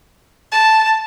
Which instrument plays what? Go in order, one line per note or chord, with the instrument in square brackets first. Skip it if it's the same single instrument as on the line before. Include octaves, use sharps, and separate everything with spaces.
[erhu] A5